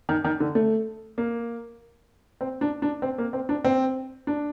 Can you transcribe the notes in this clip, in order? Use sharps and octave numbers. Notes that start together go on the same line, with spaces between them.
D#3
D#3
D3
A3
A#3
C4
D4
D4
C4
A#3
C4
D4
C4
D4